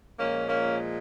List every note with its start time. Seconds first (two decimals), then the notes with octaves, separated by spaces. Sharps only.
0.19 A#2 F3 G#3 A#3 C#4
0.49 A#3 C#4